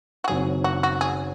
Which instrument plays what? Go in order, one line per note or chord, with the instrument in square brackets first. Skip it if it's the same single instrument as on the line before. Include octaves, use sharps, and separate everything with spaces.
[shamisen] F#4
[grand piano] F#1 F#2 D#3 F#3 C4 [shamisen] G#4
[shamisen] F#4
F#4
G#4